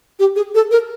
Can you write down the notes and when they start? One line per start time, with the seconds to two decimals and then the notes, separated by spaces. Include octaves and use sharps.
0.19 G4
0.36 G#4
0.55 A4
0.71 A#4